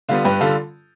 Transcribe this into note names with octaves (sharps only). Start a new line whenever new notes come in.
D3 G3 B3 F4
G2 G4 B4
D3 G3 F4 A4